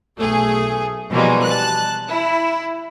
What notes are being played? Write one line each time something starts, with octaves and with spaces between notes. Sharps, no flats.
B1 A3 G#4
B2 E3 F3 G3 G#3 A#3
A5 F#6
E4